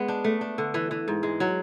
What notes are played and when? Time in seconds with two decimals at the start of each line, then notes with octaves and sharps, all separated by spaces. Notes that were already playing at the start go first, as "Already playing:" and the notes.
Already playing: G#3 B3
0.08 D4
0.24 A3
0.41 D4
0.58 D3
0.74 E3
0.91 E3
1.08 G#2
1.23 G#3
1.40 F#3